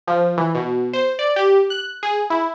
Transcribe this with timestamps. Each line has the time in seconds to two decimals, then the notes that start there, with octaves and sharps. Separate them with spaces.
0.08 F3
0.37 E3
0.55 B2
0.93 C5
1.19 D5
1.36 G4
1.70 F#6
2.03 G#4
2.30 E4